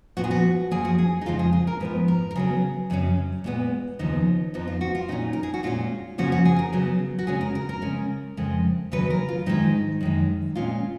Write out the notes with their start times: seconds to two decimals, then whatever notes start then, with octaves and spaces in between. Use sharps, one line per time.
0.17 A#2 F3 B3 F#4
0.24 G#4
0.31 F#4
0.71 F#2 F3 A#3 G#4
0.85 F#4
0.98 G#4
1.21 D#4
1.26 F2 C#3 F3 G#3 F4
1.39 G#4
1.53 G#4
1.67 A#4
1.80 G#2 F3 B3 B4
2.08 A#4
2.31 A#4
2.35 C#3 F#3 B3 G#4
2.90 F#2 C#3 F#3 C#4
3.44 A#2 G#3 B3
3.99 D#2 C#3 F3 B3 D#4
4.54 F2 F3 B3 D#4
4.68 F4
4.81 F#4
4.95 F4
5.08 A#2 G#3 C#4 D#4
5.33 A#4
5.43 G#4
5.54 F#4
5.63 A#2 G#3 C#4 F4
6.18 C#3 F3 A#3 C#4 F#4
6.32 F#4
6.45 G#4
6.59 A#4
6.73 C#3 F#3 B3
7.19 F#4
7.27 C#3 G#3 C#4 G#4
7.41 A#4
7.55 A#4
7.69 A#4
7.82 C#3 G#3 C#4
8.37 F2 C#3 G#3
8.91 D#2 C#3 F#3 C#4 B4
9.10 A#4
9.29 F4
9.46 G#2 D#3 G#3 D#4
10.01 F#2 D#3 G#3
10.55 A#2 G#3 C#4 F4